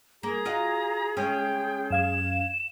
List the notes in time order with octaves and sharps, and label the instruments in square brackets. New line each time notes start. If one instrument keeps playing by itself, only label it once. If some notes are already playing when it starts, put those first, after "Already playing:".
[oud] A#3 [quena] G#4 [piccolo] A#5
[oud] F4 F#4 D#5
[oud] C#3 G#3 C#4 [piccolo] G5
[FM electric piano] F#2 F5 G#6 [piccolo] E7